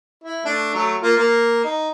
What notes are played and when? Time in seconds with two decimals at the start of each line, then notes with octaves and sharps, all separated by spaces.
0.24 E4
0.45 A3 D4
0.75 F#3 A3
1.02 A#3 F4
1.17 A#3
1.64 D#4